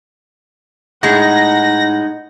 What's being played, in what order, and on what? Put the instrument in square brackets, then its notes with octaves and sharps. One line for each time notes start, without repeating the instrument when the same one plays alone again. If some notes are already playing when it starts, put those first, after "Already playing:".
[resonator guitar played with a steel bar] A2 G#3 [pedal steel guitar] D#4 [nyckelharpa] F#5 [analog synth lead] A#6